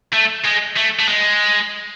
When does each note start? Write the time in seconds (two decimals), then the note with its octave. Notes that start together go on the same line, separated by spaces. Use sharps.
0.13 A3
0.44 G#3
0.76 A3
0.99 A3
1.08 G#3